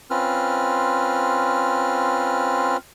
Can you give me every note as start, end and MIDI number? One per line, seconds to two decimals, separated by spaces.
0.10 2.77 60
0.10 2.77 61
0.10 2.77 65
0.10 2.77 71
0.10 2.77 89